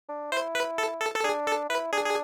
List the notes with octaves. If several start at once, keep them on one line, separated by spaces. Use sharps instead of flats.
D4
E4 C5
B4
A4
A4
A4
D4 G#4
A4
E4 B4
D4 G#4
G#4